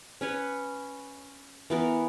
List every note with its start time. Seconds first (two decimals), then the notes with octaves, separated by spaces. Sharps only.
0.21 C#4 B4 C#5
1.70 E3 B3 A#4